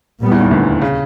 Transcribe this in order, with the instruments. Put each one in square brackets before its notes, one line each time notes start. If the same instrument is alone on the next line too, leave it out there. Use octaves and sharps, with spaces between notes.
[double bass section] A#2 G3 B3
[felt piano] E2 E3
D#2 D#3
D2 D3
C#3